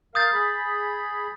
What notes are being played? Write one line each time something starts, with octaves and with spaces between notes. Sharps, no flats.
A#4 F5 D#6 G6 A6
G#4 B5